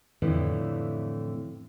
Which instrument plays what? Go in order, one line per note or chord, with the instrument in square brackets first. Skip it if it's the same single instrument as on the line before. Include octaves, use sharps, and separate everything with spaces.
[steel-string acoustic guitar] F2 A2 D3 E3